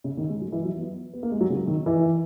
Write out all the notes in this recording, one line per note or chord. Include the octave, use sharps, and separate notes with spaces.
C#3
D#3
G#3
F#3
E3
F#3
B3
B3
A#3
G#3
F#3
C#3
D#3
E3